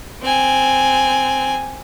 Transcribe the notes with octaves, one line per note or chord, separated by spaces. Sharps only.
C4 G#5